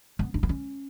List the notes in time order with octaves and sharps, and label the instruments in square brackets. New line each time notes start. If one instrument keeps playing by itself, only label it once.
[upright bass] B3
D4
B3
C#4